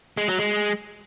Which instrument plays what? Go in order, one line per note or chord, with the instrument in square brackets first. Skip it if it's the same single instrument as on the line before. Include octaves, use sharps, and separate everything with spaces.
[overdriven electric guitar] G#3
F#3
G#3